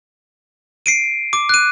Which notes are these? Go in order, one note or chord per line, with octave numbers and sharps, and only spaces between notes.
C7 D7 D#7
D6
F#6 D#7